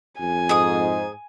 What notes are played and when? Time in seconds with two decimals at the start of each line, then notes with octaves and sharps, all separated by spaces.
0.20 F2 G#5
0.49 G#2 G#4 D#6